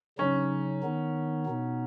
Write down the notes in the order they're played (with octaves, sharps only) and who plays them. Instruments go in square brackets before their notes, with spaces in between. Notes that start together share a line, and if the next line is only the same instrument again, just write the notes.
[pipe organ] C#3 F#3 D#4 [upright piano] C#4
[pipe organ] D#3 B3 D#4
B2 B3 D#4